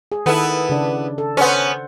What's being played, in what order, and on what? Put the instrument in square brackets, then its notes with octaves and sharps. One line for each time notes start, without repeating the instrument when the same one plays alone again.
[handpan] G#4
[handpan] D#3 A4 [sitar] B3 E4
[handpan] C#3 D4
A4
[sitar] B3 C#4 [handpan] C5 F#5